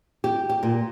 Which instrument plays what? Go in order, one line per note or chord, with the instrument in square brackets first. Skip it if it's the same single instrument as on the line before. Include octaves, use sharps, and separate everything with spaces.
[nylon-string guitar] G4
G4
A#2